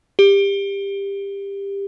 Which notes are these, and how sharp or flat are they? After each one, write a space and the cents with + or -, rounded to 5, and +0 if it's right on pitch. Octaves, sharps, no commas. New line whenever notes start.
G4 +20